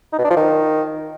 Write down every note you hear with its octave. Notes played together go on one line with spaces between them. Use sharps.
D#4
B2
D4
F3
D#3